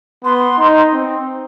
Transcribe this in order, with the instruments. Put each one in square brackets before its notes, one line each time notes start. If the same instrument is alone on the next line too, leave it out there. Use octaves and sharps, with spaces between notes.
[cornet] B3 [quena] C6
[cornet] D#4
C4